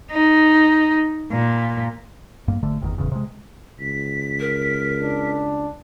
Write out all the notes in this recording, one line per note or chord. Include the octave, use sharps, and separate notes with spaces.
D#4
A#2
G2 A#3
G#1 D3 A3
G1 E2 A#2 D#3
E1 A1 E2 C#3
C3 G#3
C#2 B6
A#4
D4